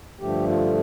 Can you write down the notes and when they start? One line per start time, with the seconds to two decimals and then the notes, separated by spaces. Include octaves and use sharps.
0.20 G2 D3 F3 A3 G4
0.47 F4